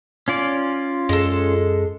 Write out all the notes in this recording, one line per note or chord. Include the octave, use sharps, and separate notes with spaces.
C#4 F4 D5
F#2 G#3 A4